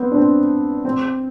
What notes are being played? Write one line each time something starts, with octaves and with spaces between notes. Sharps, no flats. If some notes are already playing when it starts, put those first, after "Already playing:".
Already playing: B3 C4
D4
C4
C4